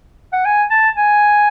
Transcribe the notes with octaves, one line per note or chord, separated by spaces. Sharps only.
F#5
G#5
A5
G#5